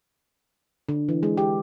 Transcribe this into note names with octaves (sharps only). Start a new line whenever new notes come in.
D3
E3
G#3
G4